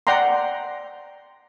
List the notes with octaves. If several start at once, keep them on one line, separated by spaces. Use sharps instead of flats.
D5 F#5 G5 A#5 C6